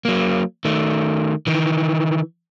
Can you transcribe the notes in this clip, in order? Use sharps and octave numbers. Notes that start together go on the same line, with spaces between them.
F#3 A#3
D#3 A3
D#3 E3